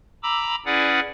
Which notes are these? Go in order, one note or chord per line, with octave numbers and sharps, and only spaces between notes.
A#5 B5 D6 E6
C#4 E4 G#4 B4 D5 F#5